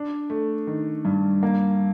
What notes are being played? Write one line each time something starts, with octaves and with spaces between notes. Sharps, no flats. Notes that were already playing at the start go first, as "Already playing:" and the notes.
Already playing: D4
A3
D#3
G2
A#3